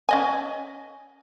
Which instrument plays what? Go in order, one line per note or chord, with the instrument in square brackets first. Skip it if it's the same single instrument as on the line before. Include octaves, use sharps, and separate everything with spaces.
[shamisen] C#4 D#5 G#5